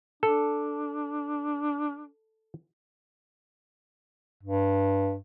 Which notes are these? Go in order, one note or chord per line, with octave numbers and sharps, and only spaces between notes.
D4 A4
G2